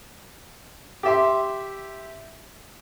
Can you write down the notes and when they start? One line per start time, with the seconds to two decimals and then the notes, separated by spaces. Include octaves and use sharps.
1.03 G4 E5 C6